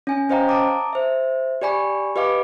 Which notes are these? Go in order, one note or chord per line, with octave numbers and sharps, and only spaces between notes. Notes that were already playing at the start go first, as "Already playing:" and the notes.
C#4 G#5
C#4 C5 D#5 F5 G5 A#5
A5 A#5 D6 D#6
C5 E5
G4 D5 G#5 B5 C#6
G4 B4 D#5 F5 B5 D6